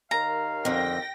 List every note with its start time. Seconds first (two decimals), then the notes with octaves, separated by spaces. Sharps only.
0.11 D#2 D#3 F5 A#5
0.65 F2 D3 G5 A#6